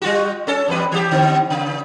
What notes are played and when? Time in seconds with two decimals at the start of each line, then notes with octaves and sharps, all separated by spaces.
0.02 G3 F4 F#4
0.47 C#4 A4
0.68 E2 G2 B4
0.92 E3 G4
1.11 D3 C4
1.50 C#3